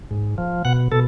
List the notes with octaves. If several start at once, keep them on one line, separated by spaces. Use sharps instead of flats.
G#2
F3
B2 F#5
B2 A4